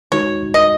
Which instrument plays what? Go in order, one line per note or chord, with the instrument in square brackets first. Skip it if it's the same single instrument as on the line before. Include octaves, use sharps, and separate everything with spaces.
[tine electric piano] D#3 G#3 D#4 F#4 [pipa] C#5
[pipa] D#5